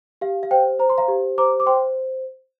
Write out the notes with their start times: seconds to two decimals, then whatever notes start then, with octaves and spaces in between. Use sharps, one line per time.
0.21 G4 F5
0.43 F5
0.51 C5 G5
0.79 C5 A#5
0.90 C6
0.98 F5 A#5
1.08 G4
1.38 C5 A#5 D6
1.60 D6
1.66 C5 G5 C6